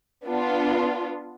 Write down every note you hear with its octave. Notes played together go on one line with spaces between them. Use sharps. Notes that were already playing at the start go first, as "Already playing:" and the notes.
B3 D4 F4